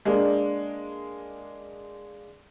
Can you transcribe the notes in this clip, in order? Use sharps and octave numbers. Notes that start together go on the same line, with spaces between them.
G#3 A#3 D4